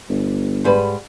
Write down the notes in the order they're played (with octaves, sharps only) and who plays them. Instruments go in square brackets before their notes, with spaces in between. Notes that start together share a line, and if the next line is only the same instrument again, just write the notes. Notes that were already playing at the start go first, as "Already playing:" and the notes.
[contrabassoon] G1
[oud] G#2 G3 B4